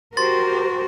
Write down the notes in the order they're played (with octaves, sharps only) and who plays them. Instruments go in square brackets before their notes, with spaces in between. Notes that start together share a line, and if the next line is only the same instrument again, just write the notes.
[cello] F#4 [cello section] G4 A#4 C5 [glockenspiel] C6 A6